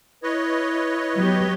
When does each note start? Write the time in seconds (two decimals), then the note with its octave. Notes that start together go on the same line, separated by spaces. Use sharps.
0.23 E4 B4 C#5 D#5
1.16 F#3 B3 G4